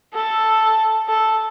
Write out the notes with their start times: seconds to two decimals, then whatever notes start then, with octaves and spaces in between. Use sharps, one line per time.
0.14 A4
1.09 A4